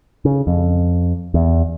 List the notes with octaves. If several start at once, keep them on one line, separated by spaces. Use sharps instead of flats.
C#3
F2
E2